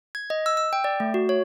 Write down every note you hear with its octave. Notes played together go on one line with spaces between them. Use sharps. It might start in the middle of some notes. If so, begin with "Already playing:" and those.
G#6
D#5
E6
E6
G5
D5
A3
F#4
C#5